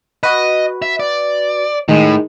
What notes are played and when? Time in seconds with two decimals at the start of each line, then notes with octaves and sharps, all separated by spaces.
0.23 F#4 B4 D#5
0.82 E5
1.00 D5
1.88 A2 D#3 G#3